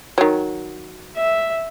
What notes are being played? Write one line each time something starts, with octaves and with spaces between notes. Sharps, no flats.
D#3 F#3
E5